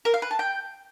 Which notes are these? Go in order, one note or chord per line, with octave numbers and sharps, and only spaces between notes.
A#4
F5
B4
A5
G5